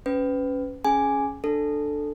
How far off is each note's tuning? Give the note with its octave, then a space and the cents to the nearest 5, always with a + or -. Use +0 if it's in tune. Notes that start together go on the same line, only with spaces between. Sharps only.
C#4 +0 B4 +25
C#4 -5 G#4 +25 G#5 +0
D4 +10 A4 +0